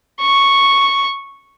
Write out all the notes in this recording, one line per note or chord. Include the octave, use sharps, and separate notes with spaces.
C#6